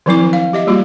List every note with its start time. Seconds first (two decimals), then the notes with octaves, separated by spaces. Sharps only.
0.06 D#3 F3 F#3 C4 E4 D6
0.33 F5
0.53 G4 D#5 E5
0.67 G3 A#3 F4 F#4